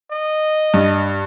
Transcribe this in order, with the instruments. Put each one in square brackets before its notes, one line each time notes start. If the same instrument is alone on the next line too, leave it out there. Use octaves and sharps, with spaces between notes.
[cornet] D#5
[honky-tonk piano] G2